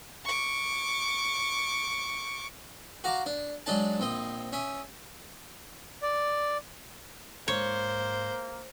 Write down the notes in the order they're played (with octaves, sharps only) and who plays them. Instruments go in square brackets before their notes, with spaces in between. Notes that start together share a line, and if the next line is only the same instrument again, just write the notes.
[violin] C#6 D6
[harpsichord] F#4 F5 A#5 D6
D4
F#3 G#3 D4 D5 A5
A#1 C4 D#5
C#4 E5 D#6
[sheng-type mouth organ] D5
[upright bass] G#2 [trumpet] A#3 [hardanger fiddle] C5 [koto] C#5